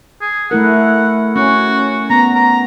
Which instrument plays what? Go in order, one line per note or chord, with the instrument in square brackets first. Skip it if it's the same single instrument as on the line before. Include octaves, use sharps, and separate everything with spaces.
[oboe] G#4
[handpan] A3 E4 A#4 [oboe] F#5
[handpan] C#4 [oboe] F#4
[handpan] B3 [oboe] A#5
[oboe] A#5